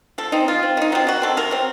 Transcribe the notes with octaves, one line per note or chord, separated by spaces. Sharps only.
F3 A4
C4 D#4
F3 F4
C4
D#3 D#4
F#3 C4 F4
D#3 F#4
F#3 C4 A4
C3 A#4
F#3 C4